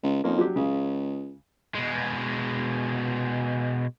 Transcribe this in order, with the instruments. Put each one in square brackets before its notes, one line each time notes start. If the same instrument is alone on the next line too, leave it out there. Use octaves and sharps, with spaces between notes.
[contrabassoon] C#2
[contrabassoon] F2 [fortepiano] A#3 C#4 D#4
[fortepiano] F#3 D4 G4
[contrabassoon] C#2 [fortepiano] C#3
[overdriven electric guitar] B2 G#3